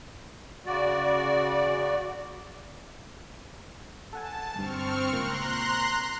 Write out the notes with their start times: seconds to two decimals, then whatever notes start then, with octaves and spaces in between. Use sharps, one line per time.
0.66 C#3 F#4 D5
4.13 A4 F#5 G#5 A5
4.55 G1 G2 C4 C#6 F6
5.13 C#2 A#2 A#3 A#5 C6 F#6